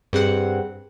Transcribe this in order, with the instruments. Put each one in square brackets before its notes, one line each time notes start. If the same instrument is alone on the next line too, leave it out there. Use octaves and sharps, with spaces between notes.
[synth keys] G2 C4 F#5 [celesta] G#4